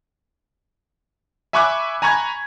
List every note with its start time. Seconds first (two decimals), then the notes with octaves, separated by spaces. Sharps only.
1.53 E5 G#5 B5 C#6 D6 F#6
2.02 G#5 A#5 B5 C#6 G#6